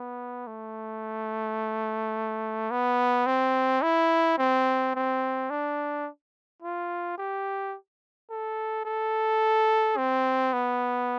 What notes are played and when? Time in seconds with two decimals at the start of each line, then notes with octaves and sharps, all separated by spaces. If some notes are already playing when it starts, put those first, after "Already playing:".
Already playing: B3
0.47 A3
2.71 B3
3.26 C4
3.82 E4
4.38 C4
4.95 C4
5.50 D4
6.62 F4
7.18 G4
8.30 A4
8.85 A4
9.97 C4
10.53 B3